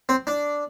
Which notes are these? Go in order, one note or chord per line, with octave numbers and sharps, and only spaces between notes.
C4
D4